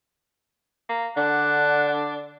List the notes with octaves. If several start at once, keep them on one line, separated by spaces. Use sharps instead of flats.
A#3
D3 D4 F#5